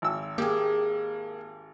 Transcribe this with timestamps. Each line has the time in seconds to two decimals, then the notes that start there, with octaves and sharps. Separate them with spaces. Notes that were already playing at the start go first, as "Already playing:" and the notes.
0.02 G#1 E6
0.38 A#3 G4 G#4